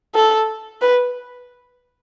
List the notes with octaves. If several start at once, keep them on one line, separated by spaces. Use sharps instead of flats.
A4
B4